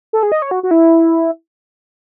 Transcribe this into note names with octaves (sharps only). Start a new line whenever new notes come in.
A4
G#4
D#5
C#5
F#4
F#4
E4